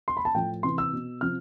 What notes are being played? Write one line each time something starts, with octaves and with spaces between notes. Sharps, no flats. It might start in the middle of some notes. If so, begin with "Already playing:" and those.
C6
B5
A5
A2 F3 G5
C3 E3 C6
E6
B2
C3 F3 F6